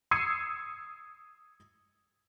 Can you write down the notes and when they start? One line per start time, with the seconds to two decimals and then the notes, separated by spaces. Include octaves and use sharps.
0.11 D#6 E6 G#6 C7 C#7 D#7